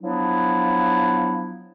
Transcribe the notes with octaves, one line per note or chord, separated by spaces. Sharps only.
F3 F#3 B3 D4 E4